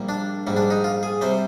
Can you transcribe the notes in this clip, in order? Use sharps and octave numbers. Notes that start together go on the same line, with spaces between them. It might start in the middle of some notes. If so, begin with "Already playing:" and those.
Already playing: A#1 A#2 G3
D4
A#1 G#2 G3
D4
D#4
F4
G#4
C3 G3 C5